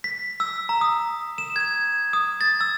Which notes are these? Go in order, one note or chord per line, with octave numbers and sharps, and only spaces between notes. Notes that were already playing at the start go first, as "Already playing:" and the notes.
B6
E6
A#5
D#6
E7
G#6
D#6
A6
E6